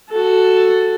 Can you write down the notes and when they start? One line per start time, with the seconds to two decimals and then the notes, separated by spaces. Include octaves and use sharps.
0.10 F#4 A4